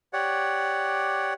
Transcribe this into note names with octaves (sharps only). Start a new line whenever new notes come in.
G4 C#5 D5 F#5